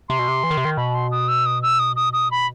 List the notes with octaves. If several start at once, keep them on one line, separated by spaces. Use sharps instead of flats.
C3 C6
B2
C3
E3
D#3
C3
D#3
B2 B5
C6
D#6
E6
D#6
E6
D#6
D#6
D#6
B5